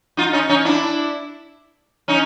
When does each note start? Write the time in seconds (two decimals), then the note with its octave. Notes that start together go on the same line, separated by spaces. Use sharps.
0.17 D#4 F4
0.33 C#4 D#4
0.49 C#4 D#4
0.65 D4 E4
2.08 C#4 D#4